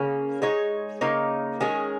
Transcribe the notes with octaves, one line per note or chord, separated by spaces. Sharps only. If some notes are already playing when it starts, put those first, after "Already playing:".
Already playing: C#3 A#3 C#4
G#3 D#4 C#5
C#3 A#3 D#4 C#5
D#3 G#3 C#4 G#4